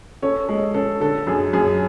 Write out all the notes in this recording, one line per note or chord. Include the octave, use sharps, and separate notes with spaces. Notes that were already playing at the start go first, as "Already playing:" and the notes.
C#4 A4 C#5
G#3 A4
C#4 A4
D3 A4
F#2 G#4
F#2 G#4